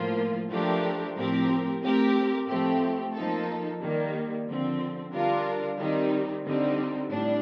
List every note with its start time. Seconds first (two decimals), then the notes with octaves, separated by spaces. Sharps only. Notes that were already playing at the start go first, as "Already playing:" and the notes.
Already playing: A2 F3 A#3 F4
0.50 F3 A3 D4 G4 A#4
1.16 A2 F3 C4 G4 A#4
1.82 A3 C4 G4 A#4
2.48 A2 F3 A3 C4 G4
3.13 F3 A#3 D#4 A4
3.81 D#3 G3 A#3
4.46 D3 F3 C4
5.11 D3 G3 D4 F4 A#4
5.78 D#3 G3 C4 D#4
6.44 D3 G3 C4 D#4
7.10 A2 G3 D4